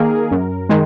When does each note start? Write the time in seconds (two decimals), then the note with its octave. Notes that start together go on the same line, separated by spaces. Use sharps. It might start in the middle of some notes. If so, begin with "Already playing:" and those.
Already playing: D#3 A#3 G#4 A#4
0.31 F#2
0.69 D#3 G#3